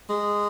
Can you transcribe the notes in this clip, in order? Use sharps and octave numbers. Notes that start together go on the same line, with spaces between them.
G#3